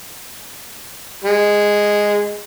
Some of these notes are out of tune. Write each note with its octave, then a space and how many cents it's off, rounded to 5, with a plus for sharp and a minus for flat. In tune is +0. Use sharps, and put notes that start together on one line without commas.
G#3 -5